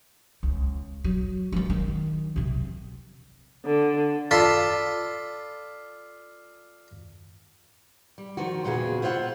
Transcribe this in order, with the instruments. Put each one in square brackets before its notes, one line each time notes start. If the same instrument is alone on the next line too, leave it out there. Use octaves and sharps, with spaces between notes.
[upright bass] C#2
F#3
E3 G3
D#3 F#3
C3 C4
[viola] D3
[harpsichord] F4 A4 D5 A5 B5 C6
[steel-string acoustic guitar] G3
D#3 F3 F#4
E2 A#2 C#3 F4 F#4 G#4
E4 F4 C5 D#5 F#5